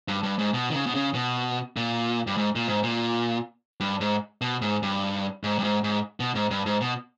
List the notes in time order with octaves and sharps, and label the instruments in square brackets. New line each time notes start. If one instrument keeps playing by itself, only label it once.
[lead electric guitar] G2
G2
G#2
B2
D#3
C#3
B2
C#3
B2
A#2
G2
G#2
A#2
G#2
A#2
G2
G#2
B2
G#2
G2
G#2
G2
G#2
G#2
B2
G#2
G2
G#2
B2